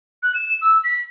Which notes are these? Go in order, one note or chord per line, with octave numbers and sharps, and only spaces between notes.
F#6
E7
E6
B6